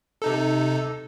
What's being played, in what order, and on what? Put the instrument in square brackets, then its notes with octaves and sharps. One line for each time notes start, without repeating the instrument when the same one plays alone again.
[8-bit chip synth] C3 D#4 A4